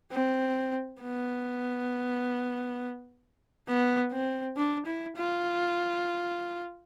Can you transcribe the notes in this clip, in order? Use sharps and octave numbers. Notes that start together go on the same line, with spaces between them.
C4
B3
B3
C4
D4
E4
F4